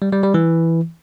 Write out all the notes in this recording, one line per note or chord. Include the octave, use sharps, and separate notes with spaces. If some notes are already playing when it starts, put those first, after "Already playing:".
G3
G3
G3
E3